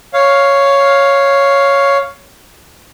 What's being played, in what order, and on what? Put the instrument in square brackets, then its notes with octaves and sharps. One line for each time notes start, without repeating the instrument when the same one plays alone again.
[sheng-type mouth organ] C#5 F5